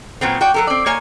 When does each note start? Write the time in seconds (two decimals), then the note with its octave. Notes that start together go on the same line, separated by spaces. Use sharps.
0.21 A#2 F#3 B3 C4
0.41 F#4 D5 G5
0.54 F#3 A4 A#4
0.67 C4 D5
0.86 A#3 C#5 G#5